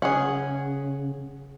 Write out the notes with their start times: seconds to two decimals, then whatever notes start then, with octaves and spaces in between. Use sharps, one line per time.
0.02 C#3 C#4 G#4 F#5